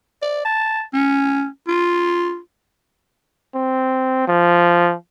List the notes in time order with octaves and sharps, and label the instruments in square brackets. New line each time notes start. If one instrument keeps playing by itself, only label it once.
[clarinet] D5
A5
C#4
F4
[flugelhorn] C4
F3